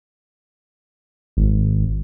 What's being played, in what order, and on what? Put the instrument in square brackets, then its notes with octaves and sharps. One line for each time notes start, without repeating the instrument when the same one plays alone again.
[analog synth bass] G#1